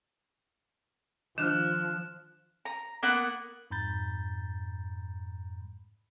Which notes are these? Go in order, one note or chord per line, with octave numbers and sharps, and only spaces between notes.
D#3 F3 D4 F6 F#6 E7
A#5
A#3 B3 F#5
F2 G#2 A#5 B5 G6 A6